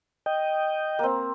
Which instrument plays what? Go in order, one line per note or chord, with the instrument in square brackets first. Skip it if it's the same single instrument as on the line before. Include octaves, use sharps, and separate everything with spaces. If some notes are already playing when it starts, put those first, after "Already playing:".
[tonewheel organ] D#5 G5
[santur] A#3 C4